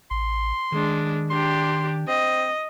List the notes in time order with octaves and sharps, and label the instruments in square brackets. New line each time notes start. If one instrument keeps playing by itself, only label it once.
[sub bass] A1 [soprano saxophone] C6
[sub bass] D#3 [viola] G#3 D4
[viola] D4 G4 [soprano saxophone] C6
[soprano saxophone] C4 [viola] D#5